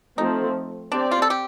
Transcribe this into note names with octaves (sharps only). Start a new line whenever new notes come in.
F3 A3 C4 D#4
C4 D4 G4 D5
F4
A4
G4